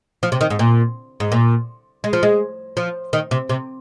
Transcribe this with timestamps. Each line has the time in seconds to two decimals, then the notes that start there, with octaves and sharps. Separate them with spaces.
0.23 F3
0.32 C3
0.41 D#3
0.50 G#2
0.59 A#2
1.20 G#2
1.32 A#2
2.04 G#3
2.13 F3
2.23 G#3
2.77 F3
3.13 D#3
3.31 C3
3.49 C3